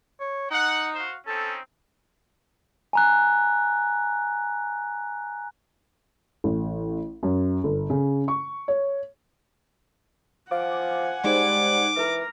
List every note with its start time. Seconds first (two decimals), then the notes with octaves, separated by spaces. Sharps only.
0.20 C#5
0.51 D#4 F#5
0.95 F#4 C5 F5
1.27 C4 C#4 D#4 A4
2.93 G#5 A#5 F#6
6.44 A1
7.23 F#2
7.64 G1
7.90 C#3
8.28 C#6
8.68 C#5
10.51 F3 F5 F#5 G#5 D6
11.24 G3 G#3 D#4 C5 D6
11.97 E3 A#4